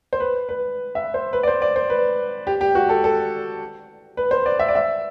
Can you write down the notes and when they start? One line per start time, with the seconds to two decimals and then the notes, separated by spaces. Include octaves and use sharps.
0.13 C5
0.20 B4
0.49 B4
0.95 E5
1.14 C5
1.33 B4
1.43 D5
1.48 C5
1.62 D5
1.76 C5
1.90 B4
2.47 G4
2.61 G4
2.75 F#4
2.89 A4
3.04 A4
4.17 B4
4.31 C5
4.46 D5
4.59 E5
4.68 D5
4.75 E5